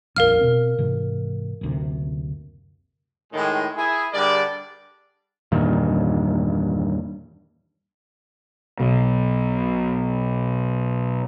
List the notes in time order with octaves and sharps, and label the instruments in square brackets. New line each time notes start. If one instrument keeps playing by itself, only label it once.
[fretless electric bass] D#1 A#1 F2 [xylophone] A#4 F5 F6
[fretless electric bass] B2 C4
G#2 C3 E3
F#1 D2 C3
[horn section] A2 D#3 G#3
E4 G#4
D3 G3 G#4 A#4 D5
[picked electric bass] E2 G2 A#2 D#3
[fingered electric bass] B1 B2